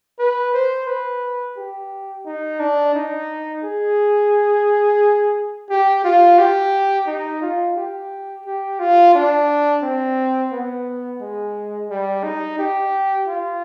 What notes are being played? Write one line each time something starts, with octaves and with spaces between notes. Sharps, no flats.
B4
C5
B4
G4
D#4
D4
D#4
G#4
G4
F4
G4
D#4
F4
G4
G4
F4
D4
C4
B3
G#3
G3
D#4
G4
F4